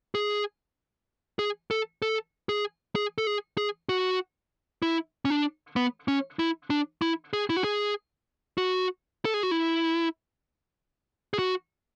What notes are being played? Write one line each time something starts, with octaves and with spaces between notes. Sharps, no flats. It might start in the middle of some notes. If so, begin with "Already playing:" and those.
G#4
G#4
A4
A4
G#4
G#4
A4
G#4
G#4
F#4
E4
C#4
D4
B3
C#4
E4
D4
E4
G#4
E4
F#4
G#4
F#4
A4
G#4
F#4
E4
G#4
F#4